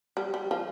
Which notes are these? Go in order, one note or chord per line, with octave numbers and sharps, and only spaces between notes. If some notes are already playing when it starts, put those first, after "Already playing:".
G3
G3
F3